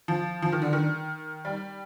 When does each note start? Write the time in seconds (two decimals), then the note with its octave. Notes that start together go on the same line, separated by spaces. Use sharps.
0.08 F3
0.42 F3
0.52 D#3
0.62 D3
0.73 D#3
1.45 G3